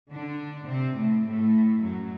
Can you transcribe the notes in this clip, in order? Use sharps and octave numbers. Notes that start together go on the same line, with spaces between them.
D3 D4
C3 C4
A2 A3
A2 A3
F#2 F#3